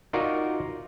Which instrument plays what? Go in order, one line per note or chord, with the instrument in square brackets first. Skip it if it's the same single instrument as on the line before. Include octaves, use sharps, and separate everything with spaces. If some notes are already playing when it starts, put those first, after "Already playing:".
[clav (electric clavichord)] D#4 F4 F#4 A#4 D5